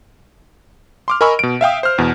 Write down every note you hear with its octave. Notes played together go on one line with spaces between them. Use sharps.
C6 D6 F6
A#4 D#5 G#5 B5 C#6 E6
B2 D7
E5 F5 G5 D#6
C5 F6
E2 B2